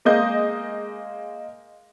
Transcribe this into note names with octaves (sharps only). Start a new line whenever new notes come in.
G#3 A#3 D#5 G6